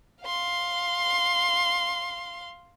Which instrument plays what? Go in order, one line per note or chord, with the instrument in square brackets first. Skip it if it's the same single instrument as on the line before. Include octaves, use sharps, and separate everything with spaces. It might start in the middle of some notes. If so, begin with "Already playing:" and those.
[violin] F5 C6